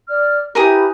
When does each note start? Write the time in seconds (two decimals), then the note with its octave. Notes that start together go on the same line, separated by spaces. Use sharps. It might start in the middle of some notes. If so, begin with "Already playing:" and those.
0.07 D5 F6
0.55 E4 G4 A#4 B4 G#5 D#6